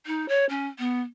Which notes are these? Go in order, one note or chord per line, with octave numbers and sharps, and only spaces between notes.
D#4
C#5
C#4
B3